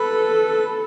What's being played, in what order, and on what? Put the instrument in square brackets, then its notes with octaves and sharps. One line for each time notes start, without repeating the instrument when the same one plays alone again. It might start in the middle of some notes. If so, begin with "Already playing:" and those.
Already playing: [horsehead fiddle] A4 [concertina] B4